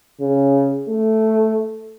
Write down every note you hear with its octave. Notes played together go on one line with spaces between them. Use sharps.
C#3
A3